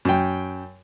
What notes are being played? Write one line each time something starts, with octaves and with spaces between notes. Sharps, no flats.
F#2 G5